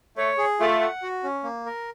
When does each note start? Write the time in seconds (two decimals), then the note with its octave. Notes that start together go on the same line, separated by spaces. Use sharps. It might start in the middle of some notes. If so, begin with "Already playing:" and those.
0.17 A3 C#5
0.38 G#4
0.60 A3 F4
0.80 F#5
1.02 F#4
1.24 C#4
1.44 A#3
1.66 A#4